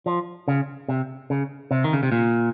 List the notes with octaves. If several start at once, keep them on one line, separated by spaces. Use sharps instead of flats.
F3
C#3
C3
C#3
C3
D#3
C#3
C3
A#2